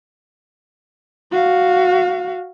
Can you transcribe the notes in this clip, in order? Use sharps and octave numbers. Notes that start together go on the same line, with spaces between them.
F#4 F5